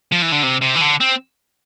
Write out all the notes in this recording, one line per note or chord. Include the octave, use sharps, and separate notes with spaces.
F3
E3
D3
C3
C3
E3
D3
C4